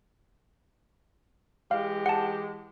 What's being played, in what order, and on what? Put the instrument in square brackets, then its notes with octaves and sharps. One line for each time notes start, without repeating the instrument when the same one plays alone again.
[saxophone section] E3 G#3 G4 [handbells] F5
[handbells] F#5 A5